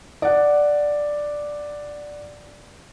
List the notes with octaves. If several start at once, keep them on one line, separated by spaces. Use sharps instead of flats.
D5 F#5